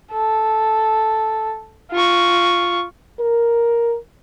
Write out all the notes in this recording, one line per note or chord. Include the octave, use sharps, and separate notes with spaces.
A4
F4 C#6
A#4